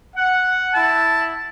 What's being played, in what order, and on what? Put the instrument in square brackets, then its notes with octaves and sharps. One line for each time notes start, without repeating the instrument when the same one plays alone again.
[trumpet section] F#5
[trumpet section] E4 [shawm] A5